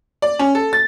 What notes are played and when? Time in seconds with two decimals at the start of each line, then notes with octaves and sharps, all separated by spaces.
0.22 D5
0.39 C#4
0.55 A4
0.73 A6